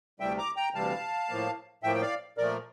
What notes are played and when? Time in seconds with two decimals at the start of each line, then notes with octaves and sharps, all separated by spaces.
0.20 D2 C3 E3 G3 E5 G5
0.38 A#5 D6
0.56 G5 A#5
0.74 D2 C3 E3 G3 F5 A5
1.29 A2 F3 A#3
1.83 A2 F3 A#3 E5 G5
1.95 G5
2.02 D5 F5
2.38 A#2 F3 A3 A#4 D5